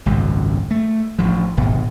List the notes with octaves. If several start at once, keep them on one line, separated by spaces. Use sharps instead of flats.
G#1 C#2 F#2
A3
A1 F3
D1 G#1 B2